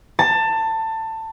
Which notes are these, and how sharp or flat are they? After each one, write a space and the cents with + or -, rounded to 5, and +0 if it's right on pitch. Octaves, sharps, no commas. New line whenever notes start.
A5 +20